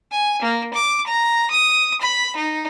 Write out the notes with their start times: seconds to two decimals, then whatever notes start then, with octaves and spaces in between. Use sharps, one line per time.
0.11 G#5
0.42 A#3
0.74 D6
1.07 A#5
1.51 D#6
2.01 B5
2.36 D#4